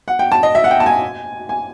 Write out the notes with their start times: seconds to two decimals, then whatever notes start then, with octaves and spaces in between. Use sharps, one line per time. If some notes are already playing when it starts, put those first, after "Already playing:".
0.08 F#5
0.19 G5
0.32 A5
0.43 D#5
0.55 E5
0.64 F#5
0.71 G5
0.80 A5
0.86 G#5
1.49 G#5